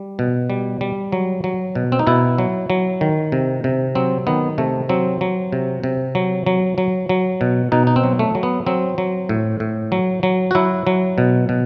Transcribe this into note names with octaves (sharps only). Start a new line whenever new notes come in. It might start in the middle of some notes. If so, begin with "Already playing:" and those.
Already playing: G3
B2
G3
G3
F#3
F#3
B2
C4
D#4
B2 E4
F#3
F#3
D#3
C3
C3
F#3 C4
D#3 B3
C3 A3
F#3 C4
F#3
C3
C3
F#3
F#3
F#3
F#3
B2
B2 D#4
D#4
C4
F#3
A3
F#3
B3
F#3 C4
F#3
A2
A2
F#3
F#3
F#4
F#3 E4
F#3
B2
B2